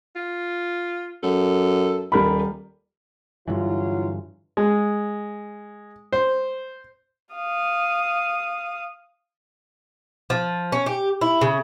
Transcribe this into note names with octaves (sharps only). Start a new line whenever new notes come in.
F4
F#2 A4
D#1 G3 A#4 B5
G2 D3 E3 F#3 E4 F4
G#3
C5
F5 D#6
F3
C#4
G4
E4
C#3